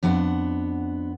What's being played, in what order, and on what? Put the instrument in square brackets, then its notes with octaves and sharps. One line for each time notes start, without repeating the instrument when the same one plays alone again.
[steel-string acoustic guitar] F2 B3 D4 F#5